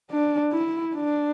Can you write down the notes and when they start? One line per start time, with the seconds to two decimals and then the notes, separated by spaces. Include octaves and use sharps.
0.11 D4
0.52 E4
0.95 D4